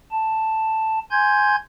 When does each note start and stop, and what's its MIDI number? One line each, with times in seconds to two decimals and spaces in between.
0.11 0.99 81
1.11 1.56 80
1.11 1.56 84
1.11 1.56 91
1.11 1.56 92